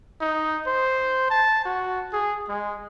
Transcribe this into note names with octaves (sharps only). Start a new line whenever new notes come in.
D#4
C5
A5
F#4
G#4
G#3